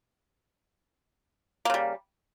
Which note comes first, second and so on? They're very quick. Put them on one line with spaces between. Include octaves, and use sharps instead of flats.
A#3 C#3 G3